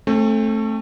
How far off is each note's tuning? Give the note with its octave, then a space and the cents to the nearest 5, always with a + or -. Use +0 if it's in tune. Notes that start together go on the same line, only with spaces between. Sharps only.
A3 +0 C4 +40